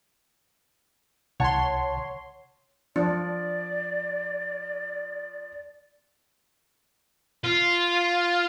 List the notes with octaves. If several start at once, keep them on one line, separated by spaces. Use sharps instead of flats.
C2 C#5 F#5 A5 C6
F3 D4 D5
F4